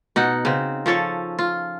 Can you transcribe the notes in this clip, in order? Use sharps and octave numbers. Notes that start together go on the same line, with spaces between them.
B2 D#4 F#5
C#3 C4
F3 C#4 A4 C#5
F4